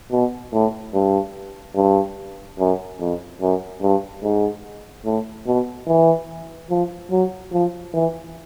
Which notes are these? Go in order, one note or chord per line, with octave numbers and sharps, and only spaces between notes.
B2
A2
G2
G2
F#2
F2
F#2
G2
G#2
A2
B2
E3
F3
F#3
F3
E3